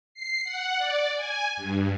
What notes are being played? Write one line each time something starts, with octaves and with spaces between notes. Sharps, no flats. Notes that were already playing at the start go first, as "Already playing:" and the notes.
C7
F#5
D5
G#5
G2